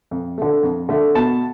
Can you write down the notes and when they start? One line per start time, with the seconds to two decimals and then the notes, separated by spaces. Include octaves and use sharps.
0.11 F2
0.38 D3 A3
0.63 F2
0.89 D3 A3
1.15 B2 A5